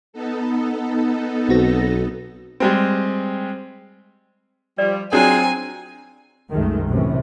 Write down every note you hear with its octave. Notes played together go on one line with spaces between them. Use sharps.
B3 D#4 A4
B1 C4 F#4 A#6
G3 G#3 C4
F3 G3 D5
F#3 C4 D4 D#4 F4 G#4 C5 G#5
C2 F#2 D#3 G#3 A3
F#2 A2 C3 E3 A3 C#4